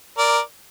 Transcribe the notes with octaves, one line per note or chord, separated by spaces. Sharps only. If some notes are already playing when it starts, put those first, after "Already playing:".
A#4 D5